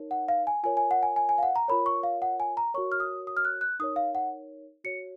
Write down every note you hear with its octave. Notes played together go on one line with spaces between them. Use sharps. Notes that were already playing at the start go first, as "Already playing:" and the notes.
Already playing: D#4 A#4 C#5
F#5
F5
G#5
F4 A#4 C#5 G#5
G#5
F#5
G#5
G#5
G#5
F5
F#5
A#5
F4 A#4 C#5 B5
C#6
F5
F#5
G#5
A#5
F#4 A#4 C#5 C#6
F6
D#6
D#6
F6
F#6
F#6
D#4 A#4 C#5 D#6
F5
F#5
F#4 C#5 C#7